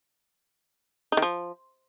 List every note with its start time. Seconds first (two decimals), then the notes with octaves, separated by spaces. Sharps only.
1.12 D#4
1.17 D#3
1.22 F3